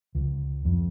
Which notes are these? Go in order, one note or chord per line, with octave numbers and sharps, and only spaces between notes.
C#2
F2